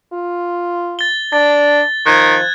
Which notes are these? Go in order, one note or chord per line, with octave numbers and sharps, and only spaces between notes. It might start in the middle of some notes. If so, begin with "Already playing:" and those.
F4
A6 G7
D4 A6
D#3 F3 F#6 G#6